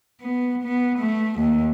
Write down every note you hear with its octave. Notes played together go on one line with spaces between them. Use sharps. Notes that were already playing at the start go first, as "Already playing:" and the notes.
B3
B3
A3
D#2